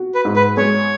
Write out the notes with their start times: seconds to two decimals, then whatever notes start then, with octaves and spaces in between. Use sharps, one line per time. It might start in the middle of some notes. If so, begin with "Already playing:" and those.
Already playing: F#4
0.15 B4
0.25 G#2
0.36 B4
0.57 G#3 C#5